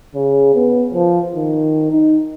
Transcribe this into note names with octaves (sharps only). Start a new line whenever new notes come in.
C#3
B3
F3
D#3
D#4